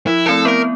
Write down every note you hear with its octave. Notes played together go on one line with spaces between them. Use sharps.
F3 E4
A3 C4 E4 A4
B3 A#4